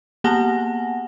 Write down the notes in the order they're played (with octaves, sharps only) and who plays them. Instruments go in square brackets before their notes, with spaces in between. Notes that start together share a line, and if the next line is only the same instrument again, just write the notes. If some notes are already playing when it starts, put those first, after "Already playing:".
[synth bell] A#3 B3 F#5 G#5 A5 A#6